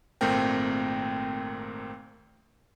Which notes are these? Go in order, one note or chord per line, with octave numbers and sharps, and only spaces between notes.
G#1 A#2 A3 C4 A#4 G5